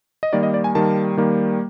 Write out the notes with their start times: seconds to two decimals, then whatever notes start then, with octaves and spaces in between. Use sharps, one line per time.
0.23 D#5
0.33 D#3 G3 A#3 D5
0.43 D#5
0.54 D5
0.64 G#5
0.75 D#3 G3 A#3 A5
1.17 D#3 G3 A#3